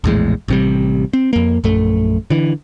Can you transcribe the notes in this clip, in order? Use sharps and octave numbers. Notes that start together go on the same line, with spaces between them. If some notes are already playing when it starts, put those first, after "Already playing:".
A#1 E2 A2 G#3
A1 C3 G3
C4
F2 A#3
A#1 F#2 A3
D3 E3